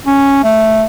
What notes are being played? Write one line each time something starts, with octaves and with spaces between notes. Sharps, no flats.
C#4
A3